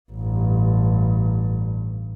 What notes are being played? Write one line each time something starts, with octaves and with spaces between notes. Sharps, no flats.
A1 G2